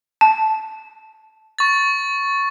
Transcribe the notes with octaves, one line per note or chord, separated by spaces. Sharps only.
A5
C#6 A6